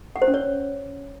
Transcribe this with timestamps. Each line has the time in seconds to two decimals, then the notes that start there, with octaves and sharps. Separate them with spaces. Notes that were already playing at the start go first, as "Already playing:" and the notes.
0.16 F#5
0.22 C5
0.28 C#4
0.34 C#5